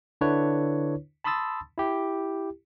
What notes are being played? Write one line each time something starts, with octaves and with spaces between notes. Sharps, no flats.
D3 D4 E4 B4 C#5
A5 B5 C6 D#6 E6 A6
E4 G4